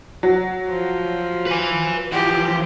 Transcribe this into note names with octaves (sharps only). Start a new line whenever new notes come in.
F#3
F3
B4 G#5
E3 F3 G4